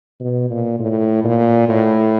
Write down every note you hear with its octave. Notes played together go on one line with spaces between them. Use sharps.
B2
A#2
A2
A#2
A2